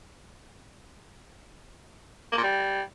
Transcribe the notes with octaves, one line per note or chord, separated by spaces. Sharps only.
A#3
A#2
G3